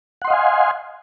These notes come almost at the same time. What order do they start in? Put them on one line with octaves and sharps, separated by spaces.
F#5 C6 D#5 F5 G#5